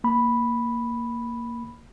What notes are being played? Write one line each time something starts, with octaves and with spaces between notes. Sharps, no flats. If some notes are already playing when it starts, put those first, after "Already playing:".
A#3 B5